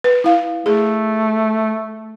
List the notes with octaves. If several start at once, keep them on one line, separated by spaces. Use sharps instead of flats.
B4
E4 F5
A3 G#4